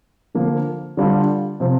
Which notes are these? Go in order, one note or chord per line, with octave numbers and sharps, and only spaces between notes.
D3 F3 A#3
D3 G3 D4 F4
C3 F3 C4